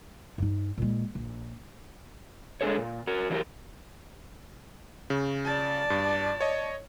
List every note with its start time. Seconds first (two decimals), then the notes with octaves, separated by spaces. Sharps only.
0.38 G2 D#4
0.78 A#2 G#3
1.15 A#1
2.61 G#3 A3 D4 G#4 A4 C#5
2.78 A#2
3.07 F#4 A#4
3.30 E3 F#3 D4 F4 G4 A#4
5.10 C#3
5.45 D5 A5
5.90 G2
6.41 C#5 D#5